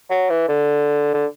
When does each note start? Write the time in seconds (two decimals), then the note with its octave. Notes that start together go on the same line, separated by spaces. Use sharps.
0.10 F#3
0.30 E3
0.49 D3
1.14 D3